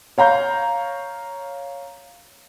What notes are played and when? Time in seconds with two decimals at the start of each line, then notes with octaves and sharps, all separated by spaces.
0.18 C#5 F5 A#5 G6